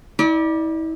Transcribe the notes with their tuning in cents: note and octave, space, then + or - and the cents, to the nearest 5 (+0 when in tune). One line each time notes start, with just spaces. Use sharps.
E4 -40 D5 +15